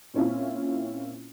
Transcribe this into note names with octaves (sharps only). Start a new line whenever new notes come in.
A#2 C4 C#4 E4 F4